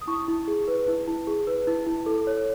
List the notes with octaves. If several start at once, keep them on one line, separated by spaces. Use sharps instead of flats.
D#6
E4 C#6
E4
G#4
B4
E4
E4
G#4
B4
E4
E4
A4
C#5